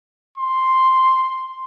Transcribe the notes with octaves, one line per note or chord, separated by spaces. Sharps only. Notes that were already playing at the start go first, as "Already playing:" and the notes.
C6